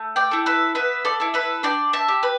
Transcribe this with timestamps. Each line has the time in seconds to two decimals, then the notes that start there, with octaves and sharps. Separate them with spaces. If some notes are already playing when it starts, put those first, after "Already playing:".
Already playing: A3
0.16 D5 G5
0.31 E4 A4
0.46 B4 E5
0.75 B3 B4 E5
1.05 A4 D5
1.20 E4 A4
1.34 B4 E5
1.63 D4 D5 G5
1.93 E5 A5
2.08 G4
2.23 B4